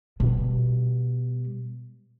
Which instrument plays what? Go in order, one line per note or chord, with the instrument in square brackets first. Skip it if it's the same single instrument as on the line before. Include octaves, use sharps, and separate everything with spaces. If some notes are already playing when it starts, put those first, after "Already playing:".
[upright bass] B2 G3